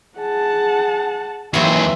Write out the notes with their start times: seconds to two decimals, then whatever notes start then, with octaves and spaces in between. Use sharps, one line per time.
0.18 G#4 F#5 A5
1.54 D#2 E3 F#3 C4 G#4 E5